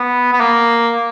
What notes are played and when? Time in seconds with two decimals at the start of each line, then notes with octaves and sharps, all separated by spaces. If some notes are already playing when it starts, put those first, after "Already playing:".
Already playing: B3
0.33 B3
0.40 A#3